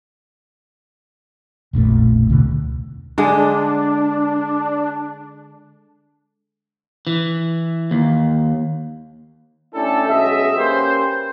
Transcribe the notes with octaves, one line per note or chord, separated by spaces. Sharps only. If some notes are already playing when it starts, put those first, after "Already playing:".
E1 A#1 F2 A3
C#2 B2 D3
D3 G#3 D4
E3
D#2
A3 C#4 D4 E4 G4 A4
B1 F#3 G#3 C#4 D#5 E5
A#3 C#4 G4 B4 C5